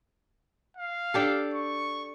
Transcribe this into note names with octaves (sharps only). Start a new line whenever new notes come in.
F5
D4 G4 A4
C#6